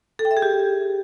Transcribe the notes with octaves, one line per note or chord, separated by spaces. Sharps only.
A4
G5
E5
G#4
G4